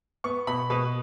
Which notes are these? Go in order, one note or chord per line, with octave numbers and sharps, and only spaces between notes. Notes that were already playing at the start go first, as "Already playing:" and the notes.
B3 C#6
B2 B5
B2 B4